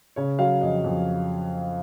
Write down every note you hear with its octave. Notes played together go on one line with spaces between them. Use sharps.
C#3 C#5
F#3 F5
F2 D#5
F2